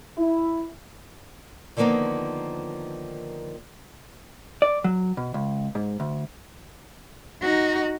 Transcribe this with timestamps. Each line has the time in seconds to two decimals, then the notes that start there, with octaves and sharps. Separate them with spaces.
0.18 E4
1.77 D3 D#3 F3 A#3 B3 D#4
4.62 D5
4.84 F#3
5.17 B2
5.34 C#2
5.75 G#2
6.00 D2
7.42 D#4 F#4